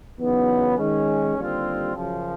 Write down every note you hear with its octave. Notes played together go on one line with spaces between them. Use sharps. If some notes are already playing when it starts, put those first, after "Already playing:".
E2 C#3 F#3 B3 D#4
D#3 G#3 C#4
D#2 D3 G3 C4 F4
F#2 C#3 F3